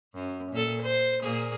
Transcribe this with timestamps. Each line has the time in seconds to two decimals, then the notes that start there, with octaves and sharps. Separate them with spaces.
0.14 F#2
0.52 A#2 A4
0.83 C5
1.23 A#2 A#3 G#4